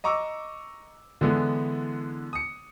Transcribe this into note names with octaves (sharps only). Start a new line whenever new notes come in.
D#5 A#5 C#6 D6 E6
D3 E3 G#3 B3 E4 A4
D#6 C#7